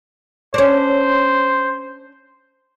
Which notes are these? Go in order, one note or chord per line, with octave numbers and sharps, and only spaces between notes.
C#4 D4 C5